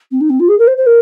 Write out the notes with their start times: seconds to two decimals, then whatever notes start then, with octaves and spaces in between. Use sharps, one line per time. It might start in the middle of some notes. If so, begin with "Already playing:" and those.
0.11 C4
0.20 D#4
0.29 C4
0.39 F4
0.48 G#4
0.58 A#4
0.67 C5
0.77 C5
0.86 A#4